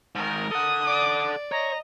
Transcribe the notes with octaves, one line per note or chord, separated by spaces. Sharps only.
G#2 D#3 A#4
A4 F#5 D#6
D5 D6
C#5 D#5 A#5